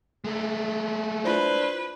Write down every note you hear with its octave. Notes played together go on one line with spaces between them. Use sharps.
G#3 A3
D4 E4 F4 B4 C5